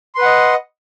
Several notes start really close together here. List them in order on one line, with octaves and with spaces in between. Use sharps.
C6 B4 F#5 D#5